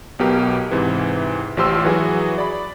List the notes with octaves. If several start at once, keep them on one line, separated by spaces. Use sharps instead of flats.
B1 B2 G4 A#4
G#2 C3 E3
A1 F3 G4 C6 E6
E3 F#3 F#4 G#4
D5 B5